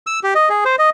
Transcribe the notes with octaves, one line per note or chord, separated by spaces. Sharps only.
E6
G4
D#5
G#4
C5
D#5